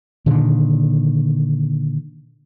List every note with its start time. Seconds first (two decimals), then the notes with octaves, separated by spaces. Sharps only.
0.26 A#2 D3 D#3